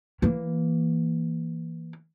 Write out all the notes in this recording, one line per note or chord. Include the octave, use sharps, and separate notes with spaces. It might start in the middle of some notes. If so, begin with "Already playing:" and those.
E3 A#3